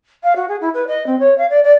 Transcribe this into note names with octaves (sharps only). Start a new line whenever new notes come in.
F5
F#4
G#4
E4
B4
D#5
C4
C#5
F5
D5
D5